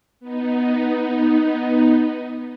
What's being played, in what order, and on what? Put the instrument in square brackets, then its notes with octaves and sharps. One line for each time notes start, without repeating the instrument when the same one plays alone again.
[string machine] B3 D#4